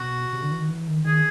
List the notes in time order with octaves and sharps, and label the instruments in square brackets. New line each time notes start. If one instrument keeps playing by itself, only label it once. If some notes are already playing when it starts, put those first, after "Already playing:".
Already playing: [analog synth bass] B2 [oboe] F#4
[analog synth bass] C3
D3
E3
D#3
E3
D#3
[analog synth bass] D#3 [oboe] G#4